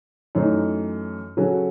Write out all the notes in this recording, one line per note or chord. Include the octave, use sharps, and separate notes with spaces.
F#2 E3 A3 D#4
C#3 F#3 C#4 F#4 A4